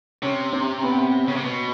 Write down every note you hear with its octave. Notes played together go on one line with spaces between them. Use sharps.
C3 C#4
C4
B3
C#3
C3
B2